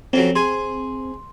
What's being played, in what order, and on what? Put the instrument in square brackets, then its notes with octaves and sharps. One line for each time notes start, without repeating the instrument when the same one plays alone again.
[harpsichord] F2 C#3 F#3 [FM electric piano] C4
[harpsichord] G#4 G#5 [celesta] C6